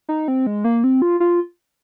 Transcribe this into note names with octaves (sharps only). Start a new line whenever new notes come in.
D#4
C4
G#3
A#3
C4
F4
F4